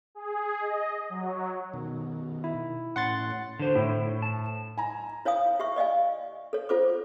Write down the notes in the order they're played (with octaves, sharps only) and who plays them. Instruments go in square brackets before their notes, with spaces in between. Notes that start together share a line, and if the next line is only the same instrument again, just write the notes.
[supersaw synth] G#4
D#5
F#3
[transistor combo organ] B2 D#3
[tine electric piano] E4
[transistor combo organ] A2 C#4 [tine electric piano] F#5 C6 A6
[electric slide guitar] D3 C5
[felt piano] A2 [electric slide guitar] E4
[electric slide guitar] A5
[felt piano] G#5 A#5
[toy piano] E4 C#5 F5 G#5 D#6
G4 E5 C#6
D5 D#5 F5 G#5
A4 C#5
F4 A4 C5 D6